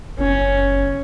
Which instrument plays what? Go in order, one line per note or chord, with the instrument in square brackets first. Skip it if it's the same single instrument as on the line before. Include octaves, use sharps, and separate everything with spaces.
[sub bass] F#1 [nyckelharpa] C#4